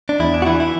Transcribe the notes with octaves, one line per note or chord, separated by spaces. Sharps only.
D4
E2 E4
D4
F#4
E3 E4
E4